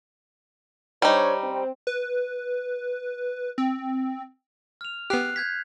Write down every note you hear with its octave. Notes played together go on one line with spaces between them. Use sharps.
G3 D4 D#4 C5 C#5
C4
B4
C4
F6 F7
B3 G4 F#6 C7
G6 G#6 B6